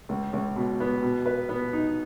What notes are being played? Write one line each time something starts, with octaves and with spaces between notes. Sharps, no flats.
C#2
C#2
B2
B3
B2
B4
B3
D#4